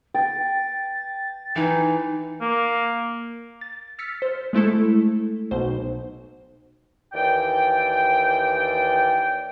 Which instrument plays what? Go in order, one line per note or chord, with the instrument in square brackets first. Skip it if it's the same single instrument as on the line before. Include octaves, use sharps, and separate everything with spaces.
[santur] G5 [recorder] A6
[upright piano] E3 [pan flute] D#4
[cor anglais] A#3
[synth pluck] A6
E6 F6 A6 B6 C#7
C5
G#3 A3 E4 A4
B1 B2 C5
[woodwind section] D#2 E3 D5 G5